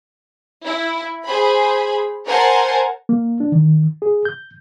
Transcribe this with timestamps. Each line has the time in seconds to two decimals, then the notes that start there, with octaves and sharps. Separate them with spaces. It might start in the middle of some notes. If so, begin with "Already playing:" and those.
0.64 E4
1.24 G#4 C5 B5
2.26 A#4 C5 F#5 G#5 A5
3.09 A#3
3.40 D4
3.52 D#3
4.02 G#4
4.25 G6